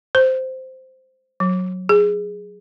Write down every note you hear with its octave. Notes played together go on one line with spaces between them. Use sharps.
C5
F#3
G#4